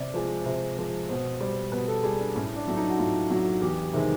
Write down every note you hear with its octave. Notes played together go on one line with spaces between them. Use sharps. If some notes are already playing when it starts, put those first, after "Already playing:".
Already playing: C3 D5
F3 G#3
C3
F3 G#3
B2 C5
G3 C5
B2 B4
A4
G3 G#4
D4
A2 C#4
D4
F#3 A3
D#4
F#4
A2 F4
F#3 A3
E2 G4
C3 D#3 G#3